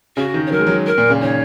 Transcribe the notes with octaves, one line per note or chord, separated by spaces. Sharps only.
C#3 F#4
D#3
C#5
F#3 A#4
G#3
F#3
A#4
A#2
C#3
D#3 C#5